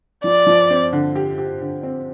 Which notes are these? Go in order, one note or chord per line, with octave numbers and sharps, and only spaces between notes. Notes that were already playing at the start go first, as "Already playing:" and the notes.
F3 D5
F3
C4
D3
G4
G4
D3
C4